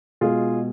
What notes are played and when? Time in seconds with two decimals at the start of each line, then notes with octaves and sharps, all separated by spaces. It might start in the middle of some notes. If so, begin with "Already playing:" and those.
0.21 B2 G#3 F4 G#4